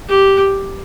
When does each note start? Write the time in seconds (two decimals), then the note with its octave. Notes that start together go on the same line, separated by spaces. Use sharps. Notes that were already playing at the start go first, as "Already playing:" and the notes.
0.08 G4